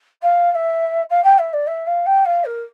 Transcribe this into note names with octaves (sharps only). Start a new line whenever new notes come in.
F5
F5
E5
F5
G5
E5
D5
E5
F5
G5
F5
A#4